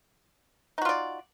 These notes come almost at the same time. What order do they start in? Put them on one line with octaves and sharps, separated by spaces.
D#4 F#4 F4 D5